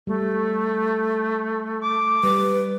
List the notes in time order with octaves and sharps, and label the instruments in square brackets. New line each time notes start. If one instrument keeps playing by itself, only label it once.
[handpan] G3 [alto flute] A3
[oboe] D6
[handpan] G3 [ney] B4